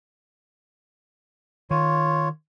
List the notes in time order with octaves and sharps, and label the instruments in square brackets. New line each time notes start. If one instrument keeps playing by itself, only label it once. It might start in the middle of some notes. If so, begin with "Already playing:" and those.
[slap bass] D#3 [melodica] F4 C#5